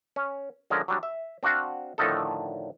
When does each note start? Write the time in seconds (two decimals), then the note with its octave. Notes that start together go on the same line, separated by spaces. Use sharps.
0.16 C#4
0.70 D3 F3 G#3 C#4 A#4
0.88 F#3 G3 D4
1.03 E5
1.43 C4 D4 F#4 F5 F#5
1.98 A2 D3 D#3 F3 D#4 A4